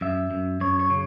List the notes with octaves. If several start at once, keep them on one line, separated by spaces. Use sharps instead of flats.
F#2 E5
F#2
F#2 C#5
C#5
C#3